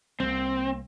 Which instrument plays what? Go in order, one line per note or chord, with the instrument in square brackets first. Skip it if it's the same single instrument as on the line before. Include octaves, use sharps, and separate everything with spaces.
[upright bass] C2 A#3 [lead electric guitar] C4